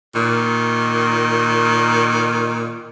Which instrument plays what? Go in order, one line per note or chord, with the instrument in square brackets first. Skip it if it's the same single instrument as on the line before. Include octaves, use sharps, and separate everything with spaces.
[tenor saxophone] A#2 [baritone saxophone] D#3